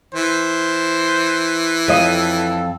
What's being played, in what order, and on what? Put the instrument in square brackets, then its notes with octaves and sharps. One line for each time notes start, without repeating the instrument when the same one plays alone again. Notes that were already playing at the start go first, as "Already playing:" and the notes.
[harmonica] E3 [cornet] C5
[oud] F2 D#5 [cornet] A4